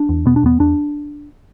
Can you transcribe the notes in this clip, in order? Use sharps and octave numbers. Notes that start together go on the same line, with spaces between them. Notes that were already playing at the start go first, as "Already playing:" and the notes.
Already playing: D4
E2
B2 B3
D4
E2 B3
E2 D4